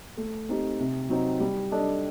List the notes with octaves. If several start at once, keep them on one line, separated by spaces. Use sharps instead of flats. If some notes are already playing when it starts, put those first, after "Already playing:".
A3
C4 D#4 G4
C3
F#3 C4 D#4
G3
D4 A4 D#5